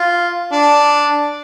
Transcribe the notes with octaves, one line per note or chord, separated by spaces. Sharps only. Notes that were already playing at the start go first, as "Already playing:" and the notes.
Already playing: F4
D4